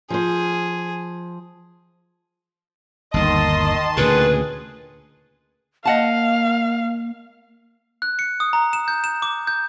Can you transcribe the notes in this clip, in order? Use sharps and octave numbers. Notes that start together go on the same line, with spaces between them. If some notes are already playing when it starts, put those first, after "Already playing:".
F3 G#4 C5
G1 D#2 D#3 D#5 A5 C6
D2 A#2 C#3 G#4 B4
A#3 D#5 F5 F#5 A5
F#6
C#7
D#6
A#5
E7
G6
E7
D6
G6